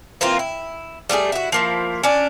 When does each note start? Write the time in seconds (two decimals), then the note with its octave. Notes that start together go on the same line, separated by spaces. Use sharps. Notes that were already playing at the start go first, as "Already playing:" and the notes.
0.21 E3 A#3 C4 F4
0.39 E4
1.09 G3 A3 F#4 G#4
1.32 E4 F#4
1.52 F3 A#3 E4
2.03 C#4 D4 D5